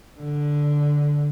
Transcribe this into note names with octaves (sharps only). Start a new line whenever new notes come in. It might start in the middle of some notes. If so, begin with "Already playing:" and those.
D3